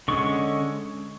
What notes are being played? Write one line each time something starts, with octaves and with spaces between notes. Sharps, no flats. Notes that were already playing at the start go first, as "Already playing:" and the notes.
D3 G#3 C#4 C#6